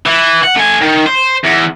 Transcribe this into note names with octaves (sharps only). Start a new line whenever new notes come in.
E3
F#5
A3 G#5
D#3
C5
E2